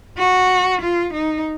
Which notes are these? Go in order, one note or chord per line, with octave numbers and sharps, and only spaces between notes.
F#4
F4
D#4